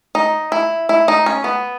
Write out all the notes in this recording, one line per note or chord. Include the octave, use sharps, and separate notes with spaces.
D#4
E4
E4
D#4
C#4
B3